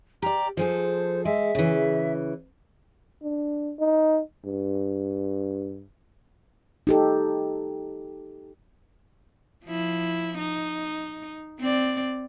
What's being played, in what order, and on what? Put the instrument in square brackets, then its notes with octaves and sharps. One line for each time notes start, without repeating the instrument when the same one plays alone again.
[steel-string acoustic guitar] G4 D5 [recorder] A#5
[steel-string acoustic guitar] F3 G#4 A4 [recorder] C5
[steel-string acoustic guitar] G#3 [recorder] E5
[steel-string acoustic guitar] C#3 E3
[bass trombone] D4
D#4
G2
[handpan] D#4 G4 A4
[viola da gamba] F3 E4
D#4
C4 D5